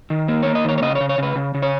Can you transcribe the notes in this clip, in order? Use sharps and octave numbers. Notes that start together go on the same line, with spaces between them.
D#3
A#3
A#3 C#5
D#5
D#3 C#5
C#5
C#3 D#5
C#5
C#3
C#5
C#3 B4
C#3
C#3
C#5